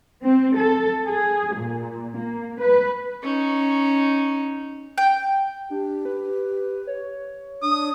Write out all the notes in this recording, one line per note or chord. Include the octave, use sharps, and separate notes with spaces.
C4
A4
G#4
A#2
A#3
B4
C#4 D#4
G5
D4 G4
B4
C#5
D4 D#6